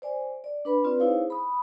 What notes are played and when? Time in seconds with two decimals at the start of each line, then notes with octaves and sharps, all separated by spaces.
0.02 C5 D5 G#5
0.44 D5
0.65 D4 B4 B5
0.84 C4 F4 B4 D5
1.00 D#4 E4 G#4 C5 C#5 F5
1.30 B5 D#6